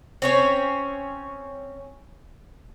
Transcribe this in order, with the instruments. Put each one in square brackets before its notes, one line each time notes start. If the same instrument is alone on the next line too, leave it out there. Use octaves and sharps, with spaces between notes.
[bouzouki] C4 C#4 C#5